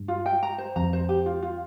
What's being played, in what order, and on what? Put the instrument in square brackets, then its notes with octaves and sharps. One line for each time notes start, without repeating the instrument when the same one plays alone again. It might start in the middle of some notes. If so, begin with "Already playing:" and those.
Already playing: [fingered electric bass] G2
[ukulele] F4
G5
A#5
C5
[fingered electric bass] F2 [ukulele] A#5
[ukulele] C5
G4
F4
F4